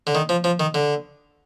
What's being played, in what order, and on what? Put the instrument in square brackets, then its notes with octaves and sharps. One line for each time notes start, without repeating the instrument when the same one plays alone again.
[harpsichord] D3
D#3
F3
F3
D#3
D3